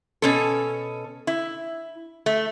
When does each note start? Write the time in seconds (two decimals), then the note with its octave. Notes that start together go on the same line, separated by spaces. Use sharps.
0.22 B2 C#4 A4
1.27 E4
2.26 A3